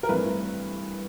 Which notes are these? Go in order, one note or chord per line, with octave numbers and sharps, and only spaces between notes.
A#4
G2 E3 A3 C4 B4